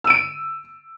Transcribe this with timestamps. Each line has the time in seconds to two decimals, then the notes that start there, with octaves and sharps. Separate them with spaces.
0.04 E6
0.07 D#7
0.10 D7